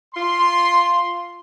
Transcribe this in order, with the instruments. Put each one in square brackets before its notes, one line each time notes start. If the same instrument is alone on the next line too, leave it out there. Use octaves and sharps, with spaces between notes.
[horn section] F4 C6